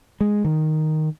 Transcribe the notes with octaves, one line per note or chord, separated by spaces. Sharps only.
G#3
D#3